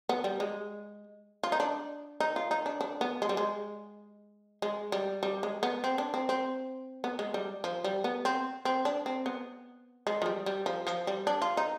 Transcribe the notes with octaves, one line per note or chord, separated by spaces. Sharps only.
B3
G3
G#3
F4
D#4
D4
D#4
F4
D#4
D4
D4
B3
G#3
G3
G#3
G#3
G3
G3
G#3
B3
C4
D4
C4
C4
B3
G#3
G3
F3
G3
B3
C4
C4
D4
C4
B3
G#3
F3
G3
G3
F3
F3
G3
D4
F4
D#4